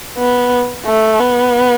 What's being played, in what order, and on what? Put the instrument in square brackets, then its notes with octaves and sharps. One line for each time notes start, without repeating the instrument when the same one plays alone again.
[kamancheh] B3
A3
B3